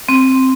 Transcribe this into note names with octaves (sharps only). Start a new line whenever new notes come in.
C4